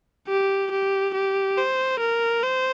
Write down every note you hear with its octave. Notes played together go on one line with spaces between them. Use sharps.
G4
G4
G4
C5
A#4
C5